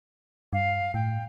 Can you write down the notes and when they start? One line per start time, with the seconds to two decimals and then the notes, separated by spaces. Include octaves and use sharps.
0.53 G2 F5
0.94 A2 G5